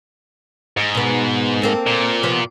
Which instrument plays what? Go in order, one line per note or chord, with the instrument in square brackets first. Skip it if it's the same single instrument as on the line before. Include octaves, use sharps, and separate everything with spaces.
[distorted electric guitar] G#2
[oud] B2 B3
A#3 C4 A4
[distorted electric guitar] A#2
[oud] C3 F3 B3